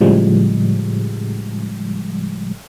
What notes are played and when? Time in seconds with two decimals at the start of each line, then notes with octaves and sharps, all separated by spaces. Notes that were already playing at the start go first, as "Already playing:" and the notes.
0.01 A2 C#3 F3 G3 G#3